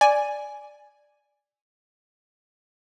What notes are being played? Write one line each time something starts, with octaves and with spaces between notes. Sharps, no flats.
D5 G#5